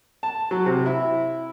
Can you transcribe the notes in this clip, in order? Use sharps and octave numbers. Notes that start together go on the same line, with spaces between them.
A5
F#3
C3
E4